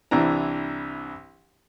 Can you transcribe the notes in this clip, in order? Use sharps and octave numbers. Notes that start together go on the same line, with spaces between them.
C2 E3 D4 A#5